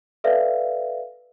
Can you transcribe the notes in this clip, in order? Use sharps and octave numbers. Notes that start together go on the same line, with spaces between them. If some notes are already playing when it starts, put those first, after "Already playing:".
A4 B4 D5 E5 F5